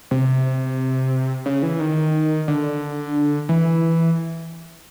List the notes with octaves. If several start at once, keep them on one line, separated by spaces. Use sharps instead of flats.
C3
C#3
E3
D#3
D3
E3